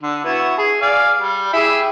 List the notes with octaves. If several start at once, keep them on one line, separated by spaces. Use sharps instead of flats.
D3
B3 E4 F#4
G#4
D5 F5 G#5
G3
E4 G4 G#4